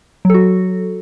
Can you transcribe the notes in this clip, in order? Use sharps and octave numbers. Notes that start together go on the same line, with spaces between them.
F#3 F#4 A4